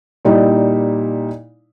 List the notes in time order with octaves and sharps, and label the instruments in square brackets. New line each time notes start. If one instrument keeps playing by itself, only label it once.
[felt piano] A#2 G3 D#4 E4